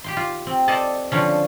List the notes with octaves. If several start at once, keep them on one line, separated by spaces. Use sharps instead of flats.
G4 G5 C6
F4
C4
A4 C5 D5 D#5 A5
D3 F3 C#4